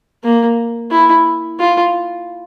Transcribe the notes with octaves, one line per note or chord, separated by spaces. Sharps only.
A#3
E4
F4